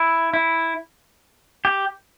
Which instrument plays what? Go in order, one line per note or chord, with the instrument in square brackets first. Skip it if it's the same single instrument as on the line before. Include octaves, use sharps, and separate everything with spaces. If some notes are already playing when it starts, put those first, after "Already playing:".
Already playing: [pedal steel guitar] E4
E4
G4